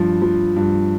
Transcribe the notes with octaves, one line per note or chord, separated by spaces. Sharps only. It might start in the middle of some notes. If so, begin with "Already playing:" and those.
Already playing: G2 F3
F3
G2